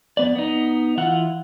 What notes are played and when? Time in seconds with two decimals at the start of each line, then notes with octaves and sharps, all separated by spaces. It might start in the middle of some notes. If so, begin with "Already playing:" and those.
0.17 F2 B3 D5
0.35 B3 D#4
0.97 E3 E4 F4 F#5